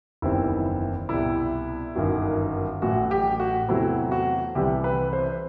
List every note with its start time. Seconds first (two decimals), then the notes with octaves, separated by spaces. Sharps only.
0.22 F#1 E2 D#3 G3 C4 E4
1.09 C2 B2 G3 E4
1.95 G1 F#2 D#3 F#3
2.82 A1 A2 F#3 F#4
3.11 G4
3.40 F#4
3.68 E2 C3 F#3 A3 C4 E4
4.12 F#4
4.55 C2 C3 E3 G3 G4
4.84 B4
5.13 C5